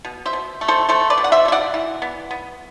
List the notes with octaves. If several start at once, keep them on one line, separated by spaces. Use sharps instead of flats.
B2
C5 E5
B2
A3
A4 C5
A3 A4 C5
B4 D5
B2
F#5
C5 E5
B2 E5
D5 F#5
E3
B3
B3